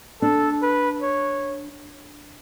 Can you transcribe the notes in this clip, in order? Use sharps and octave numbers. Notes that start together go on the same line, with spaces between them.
D4 A4
B4
C#5